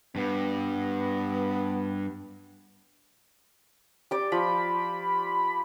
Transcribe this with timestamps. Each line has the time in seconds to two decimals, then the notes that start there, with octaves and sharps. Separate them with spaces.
0.16 G2 B3
4.11 G4 D5
4.32 F3 B5